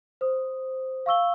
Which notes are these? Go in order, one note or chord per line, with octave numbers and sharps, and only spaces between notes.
C5 D#6
F5 C#6 E6 G7